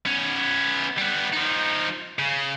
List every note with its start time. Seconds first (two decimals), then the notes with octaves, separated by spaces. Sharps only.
0.06 B3 C#4
0.98 G3 B3
1.33 F3 D#4
2.19 C#3